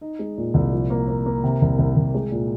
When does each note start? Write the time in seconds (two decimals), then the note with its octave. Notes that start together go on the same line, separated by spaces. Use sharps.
0.01 D#4
0.19 G#3
0.38 A#2
0.54 C2
0.72 F3
0.90 A#3
1.08 A#3
1.26 A#3
1.44 C3
1.62 C2
1.79 C2
1.96 C2
2.15 G#3
2.32 A#2